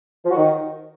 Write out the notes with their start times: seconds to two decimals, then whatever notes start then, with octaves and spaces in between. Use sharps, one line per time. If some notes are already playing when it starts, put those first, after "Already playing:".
0.25 F3
0.30 F#4
0.35 D#3